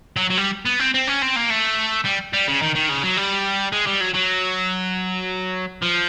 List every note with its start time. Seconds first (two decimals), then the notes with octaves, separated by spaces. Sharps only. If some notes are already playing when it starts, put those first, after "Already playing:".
0.17 F#3
0.30 F#3
0.37 G3
0.65 B3
0.79 C4
0.94 C4
1.07 C#4
1.22 C4
1.36 A#3
1.50 A3
2.05 G3
2.33 G3
2.48 C#3
2.62 D#3
2.75 D#3
2.89 C#3
3.03 F#3
3.17 G3
3.73 G#3
3.87 G3
4.01 F#3
4.14 F#3
5.82 F3